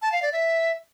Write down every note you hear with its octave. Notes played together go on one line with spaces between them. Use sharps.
A5
F5
D5
E5